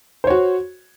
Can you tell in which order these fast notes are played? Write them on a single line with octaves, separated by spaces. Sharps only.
C5 C#5 F#4